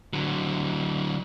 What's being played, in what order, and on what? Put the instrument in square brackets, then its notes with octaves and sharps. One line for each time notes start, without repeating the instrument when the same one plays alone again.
[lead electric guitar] D3 F#3